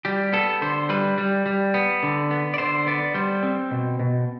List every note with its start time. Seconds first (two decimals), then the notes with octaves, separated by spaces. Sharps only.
0.05 G3 G4
0.33 B3 A4
0.62 D3 C5
0.89 G3 B4
1.18 G3
1.46 G3
1.74 B3
2.03 D3
2.31 B3
2.54 D5
2.58 D3 C5
2.87 B3 D5
3.14 G3 C5
3.43 C4
3.71 B2
4.00 B2